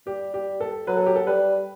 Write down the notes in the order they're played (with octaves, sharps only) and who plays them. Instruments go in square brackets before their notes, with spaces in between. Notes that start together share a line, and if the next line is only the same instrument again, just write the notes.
[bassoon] G3 [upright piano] G4
[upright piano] G4
A4
[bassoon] F#3 [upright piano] B4
[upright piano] A4
G4
A4
[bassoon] G3 [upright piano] B4